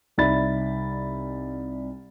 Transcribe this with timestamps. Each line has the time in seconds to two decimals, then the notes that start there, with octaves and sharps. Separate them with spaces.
0.18 C2 D#4 D5 E5 B5 A6